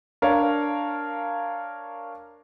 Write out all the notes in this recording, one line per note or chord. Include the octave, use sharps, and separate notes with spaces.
D4 A#4 C#5 F5